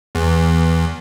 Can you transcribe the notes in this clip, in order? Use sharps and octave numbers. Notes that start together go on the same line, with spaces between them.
E2